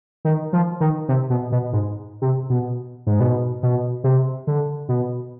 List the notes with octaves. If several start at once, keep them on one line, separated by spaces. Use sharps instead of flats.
D#3
F3
D#3
C3
B2
B2
G#2
C3
B2
G#2
B2
B2
C3
D3
B2